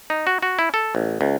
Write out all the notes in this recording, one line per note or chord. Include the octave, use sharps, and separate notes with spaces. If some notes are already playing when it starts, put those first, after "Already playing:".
D#4
F#4
F#4
E4
A4
A1
C#2